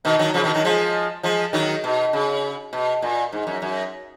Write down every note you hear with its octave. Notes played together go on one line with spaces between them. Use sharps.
B2 D#3
D#3 F#3
C#3 F3
B2 D#3
D#3 F#3
F3 G#3
F3 G#3
D#3 F#3
B2
C#3
B2
A#2
G#2
F#2
F#2